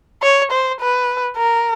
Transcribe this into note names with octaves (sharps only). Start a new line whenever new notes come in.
C#5
C5
B4
A#4